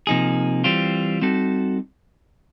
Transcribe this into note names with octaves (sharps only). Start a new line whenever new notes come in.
C3 F3 A#3 D#4 G#4
E3 G3 C4 F4
G3 C4 D#4 F#4 A4